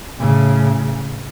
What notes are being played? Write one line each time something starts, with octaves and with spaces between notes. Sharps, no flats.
A2 C#3